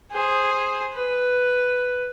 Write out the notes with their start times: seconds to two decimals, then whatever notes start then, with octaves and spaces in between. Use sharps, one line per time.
0.11 G#4 C5
0.94 B4